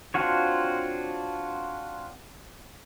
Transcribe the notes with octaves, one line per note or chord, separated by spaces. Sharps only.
C4 D4 F4 F#4 C#5